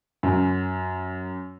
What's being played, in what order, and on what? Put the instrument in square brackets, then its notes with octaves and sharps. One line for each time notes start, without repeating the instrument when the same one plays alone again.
[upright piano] F#2